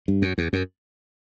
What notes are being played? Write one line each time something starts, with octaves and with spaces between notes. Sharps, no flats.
G2
F#2
E2
F#2